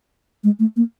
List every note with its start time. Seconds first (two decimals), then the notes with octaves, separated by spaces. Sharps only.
0.44 G#3
0.59 A3
0.76 A#3